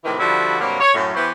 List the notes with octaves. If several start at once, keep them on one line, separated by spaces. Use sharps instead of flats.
A2 C3 D#3 E3
D3 F3 G3 E4 F#4
G2 C3 F#3 G3 A#3
C#5
F#2 A2
E3 B3 E4 F#4 G4 C5